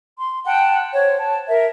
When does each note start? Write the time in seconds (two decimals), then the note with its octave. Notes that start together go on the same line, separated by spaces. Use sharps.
0.19 C6
0.46 F#5 G5 A5
0.94 C5 C#5 F#5
1.17 A5
1.49 A#4 E5